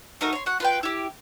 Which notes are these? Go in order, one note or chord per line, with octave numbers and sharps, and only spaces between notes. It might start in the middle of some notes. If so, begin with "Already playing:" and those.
A3 D#4 F#4 A#4
C#5 C6
F#4 F#5
F4 B4 G5
E4 G4